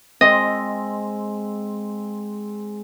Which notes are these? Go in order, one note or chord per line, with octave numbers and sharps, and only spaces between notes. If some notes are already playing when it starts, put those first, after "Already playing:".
G#3 C4 D#5